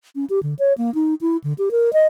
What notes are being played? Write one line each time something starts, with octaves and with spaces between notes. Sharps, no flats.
C#4
G4
D3
C#5
A#3
D#4
E4
D3
G4
A#4
D#5